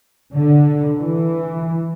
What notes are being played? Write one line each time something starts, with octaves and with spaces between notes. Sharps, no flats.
D3
E3